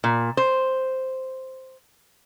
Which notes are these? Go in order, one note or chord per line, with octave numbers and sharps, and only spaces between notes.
A#2
C5